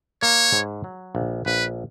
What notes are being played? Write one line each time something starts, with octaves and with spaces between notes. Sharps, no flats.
A#3 C#5
G#2
F#3
A#1
A#1 B4